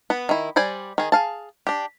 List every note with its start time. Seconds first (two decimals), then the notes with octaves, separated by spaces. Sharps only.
0.10 B3 B4
0.29 D#3 E4
0.56 G3 C5 D5 G#5
0.98 D#3 G#4
1.12 G#4 F5 A5
1.67 D4 G4